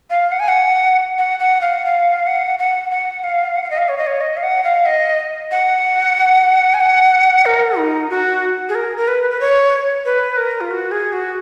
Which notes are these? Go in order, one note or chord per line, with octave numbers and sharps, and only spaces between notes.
F5
F#5
G#5
F#5
F#5
F#5
F5
F#5
F5
F#5
F#5
F#5
F5
F#5
F5
D#5
F5
C#5
D#5
C#5
D#5
F5
F#5
F5
D#5
F#5
G#5
F#5
A#4
D#4
F#4
G#4
A#4
A#4
B4
B4
C#5
B4
A#4
F4
F#4
G#4
F#4